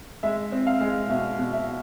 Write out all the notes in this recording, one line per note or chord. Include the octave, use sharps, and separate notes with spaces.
G#3 E5
C4
F5
G#3
B2 E5
B2
E5